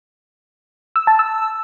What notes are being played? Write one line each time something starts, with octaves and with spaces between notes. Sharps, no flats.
E6
A5
E6